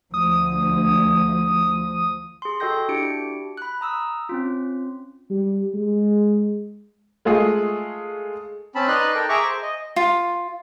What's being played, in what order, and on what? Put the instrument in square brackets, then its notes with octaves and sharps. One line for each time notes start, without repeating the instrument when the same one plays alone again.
[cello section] D2 [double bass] F3 [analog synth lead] D#6
[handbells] G#4 C6
F#4 A4 D#5 G5 G6 A#6
D4 E4 F#4 G4 C#7 D7
B5 F#6
A#5 D#6 E6
C4 C#4 F4
[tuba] G3
G#3
[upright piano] G#3 A3 F4 G#4
[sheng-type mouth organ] C4 C#4 A5 B5
D#4 B4 D5 D#5 C6 F#6
A4 A#4 G5
G#4 E5 A#5 C#6 D6
C5
D#5
[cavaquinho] F4